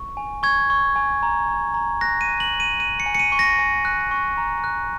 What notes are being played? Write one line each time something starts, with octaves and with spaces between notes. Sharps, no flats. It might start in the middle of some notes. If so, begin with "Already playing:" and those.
Already playing: C#6
G#5
C#6 G#6
C#6
G#5
A#5
A#5
A#5
F#6 A#6
D#7
F#6
F#7
F#6
D#7
F#6 D#7
C#7
G#5
C#7
D#7
C#6
A#6
G#5
F#6
C#6
A#5
F#6